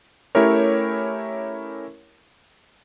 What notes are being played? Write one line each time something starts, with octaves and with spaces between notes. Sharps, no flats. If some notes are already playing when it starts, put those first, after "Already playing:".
A3 C#4 E4 G4 A#4 C#5